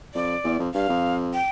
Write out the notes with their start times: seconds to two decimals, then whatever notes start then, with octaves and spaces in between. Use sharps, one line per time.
0.14 F2 D5
0.44 E2
0.59 F2
0.74 G2 F5
0.89 F2
1.34 G5